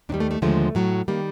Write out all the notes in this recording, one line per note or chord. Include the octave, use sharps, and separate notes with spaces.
D#2 D#3 G3 D4
A3
A3
D#2 D3 F3 G#3 A3
A2 F#3 A3
D#3 G3 A#3